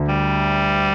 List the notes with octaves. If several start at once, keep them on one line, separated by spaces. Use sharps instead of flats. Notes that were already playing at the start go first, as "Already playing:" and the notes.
Already playing: D2 D3
G3